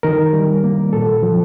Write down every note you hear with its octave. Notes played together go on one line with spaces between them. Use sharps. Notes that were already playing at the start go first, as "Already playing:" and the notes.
D#3 A#4
G3
A#3
A#2 A4
F3